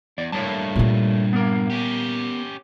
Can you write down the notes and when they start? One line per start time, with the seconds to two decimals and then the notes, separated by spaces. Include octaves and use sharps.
0.18 E2 D5
0.32 G2 A3 A#3 C#5 A5
0.76 A#2 G3
1.33 B3 A#4
1.70 C#4 G4